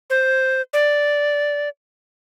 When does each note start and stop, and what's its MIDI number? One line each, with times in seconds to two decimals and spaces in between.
0.10 0.61 72
0.73 1.69 74